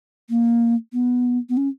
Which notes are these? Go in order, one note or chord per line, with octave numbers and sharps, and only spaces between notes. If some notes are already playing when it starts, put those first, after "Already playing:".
A#3
B3
B3
C#4